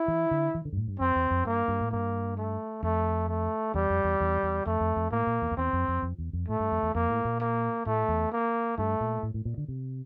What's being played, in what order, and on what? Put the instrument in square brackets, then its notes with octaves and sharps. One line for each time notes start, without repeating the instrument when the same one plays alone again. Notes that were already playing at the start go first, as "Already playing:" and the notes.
Already playing: [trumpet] E4
[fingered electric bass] E3
D3
E3
D3
G2
A2
G2
[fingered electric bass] F2 [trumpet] C4
[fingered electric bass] E2
F2
[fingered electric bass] G2 [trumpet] A#3
[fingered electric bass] G2
A2
[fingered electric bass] G2 [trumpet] A#3
[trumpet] A3
[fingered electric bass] F2 [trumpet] A3
[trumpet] A3
[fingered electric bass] E2 [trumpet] G3
[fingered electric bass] F2
E2
E2
E2
[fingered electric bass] F2 [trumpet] A3
[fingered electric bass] F2
F2
[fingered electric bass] A2 [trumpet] A#3
[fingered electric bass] A#2
E2
F2
[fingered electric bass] E2 [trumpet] C4
[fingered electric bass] F2
F2
F2
E2
F2
[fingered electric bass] A2 [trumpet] A3
[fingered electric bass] G2
F2
E2
[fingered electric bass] F2 [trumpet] A#3
[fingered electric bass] A2
A#2
[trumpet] A#3
[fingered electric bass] A2 [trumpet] A3
[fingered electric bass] E2
[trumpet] A#3
[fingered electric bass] G2 [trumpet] A3
[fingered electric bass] A#2
A2
A2
A#2
D3
C3